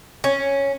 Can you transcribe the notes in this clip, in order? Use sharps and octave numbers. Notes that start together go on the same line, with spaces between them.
C#4